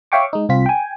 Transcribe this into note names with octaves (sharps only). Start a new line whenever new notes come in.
C#5 E5 F5 G5 C#6 D6
G#3 D#4
C2 C4 F4 B6
G5 G#5